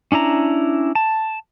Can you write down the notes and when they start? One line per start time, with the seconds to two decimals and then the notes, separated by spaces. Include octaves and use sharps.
0.12 C#4 D4 E4 A#5
0.95 A5